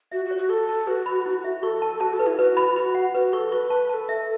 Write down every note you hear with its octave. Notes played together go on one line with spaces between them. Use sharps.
F#4 E5
F#4
C#5
F#4
A4 C#6
A5
F#4 B4
B5
E4
E5
A4 C#6
A5
F#4 A5
A4
B4
E4
F#4 B4
B5
F#4 B5
F#5
F#4 B4
A4 C#6
B4 C#6
A5
A4 B4 A5
E5